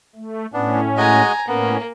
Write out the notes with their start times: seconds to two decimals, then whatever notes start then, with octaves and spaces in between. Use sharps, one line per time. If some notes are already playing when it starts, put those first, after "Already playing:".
0.16 A3
0.53 A2 B3 C#4 D4
0.97 G#3 F#4 D#5 G#5 A#5
1.48 A2 A#3 B3 C#4